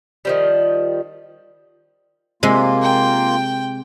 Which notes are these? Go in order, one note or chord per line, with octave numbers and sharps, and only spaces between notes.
D#3 F3 G3
C3 G#3 A#3 F4
G5